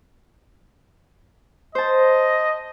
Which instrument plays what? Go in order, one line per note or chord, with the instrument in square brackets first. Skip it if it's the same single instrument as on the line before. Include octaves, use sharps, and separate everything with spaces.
[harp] C5 A5 [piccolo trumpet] D#5